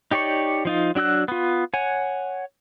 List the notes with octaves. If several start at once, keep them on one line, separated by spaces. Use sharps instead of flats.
D#4 G4 C#5 D5 C#6
F3 D#4 F4
F#3 D4 F#4 E6 F#6
B3 F4
C#5 F#5 G#5